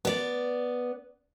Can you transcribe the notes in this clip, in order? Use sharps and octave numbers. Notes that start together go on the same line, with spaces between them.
B3 D5